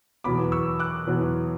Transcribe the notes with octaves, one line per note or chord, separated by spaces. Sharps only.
E2 B2 F#3 B3 B5 D6
C#6 E6
D6 F#6
E2 B2 F#3 B3